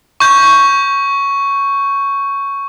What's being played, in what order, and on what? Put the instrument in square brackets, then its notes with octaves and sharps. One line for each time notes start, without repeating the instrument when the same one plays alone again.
[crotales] C#6 G6